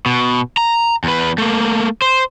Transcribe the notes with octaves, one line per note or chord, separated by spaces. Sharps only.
B2
A#5
E2 B4
A3 A#3
C5